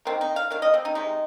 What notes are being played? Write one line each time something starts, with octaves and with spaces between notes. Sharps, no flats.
D#3 A#3 C4
D#4
F5
D#3 A#3 F5
D#5
C4
D#4
C3 G#3 D#4